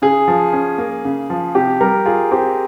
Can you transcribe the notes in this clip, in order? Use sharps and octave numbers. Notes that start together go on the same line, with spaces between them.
C#3 G#4
F3
C#4
A#3
C#3
F3
C3 G4
G3 A#4
F4 G#4
C4 G4